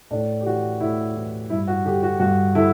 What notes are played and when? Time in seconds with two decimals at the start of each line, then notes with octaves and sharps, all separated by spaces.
0.11 A2 D4
0.41 G4
0.46 E3 F#4
0.80 A2 E4
1.16 E3
1.50 G2 E4
1.67 F#4
1.85 D3 G4
2.03 F#4
2.20 G2 F#4
2.55 D3 E4